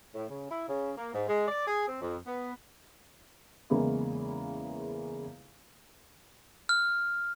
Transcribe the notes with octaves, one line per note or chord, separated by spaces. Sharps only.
A2
C#3
E4
C#3
A#3
G#2
G#3
D5
G#4
C4
F2
B3
E2 C#3 G#3 A#3 B3 E4
F6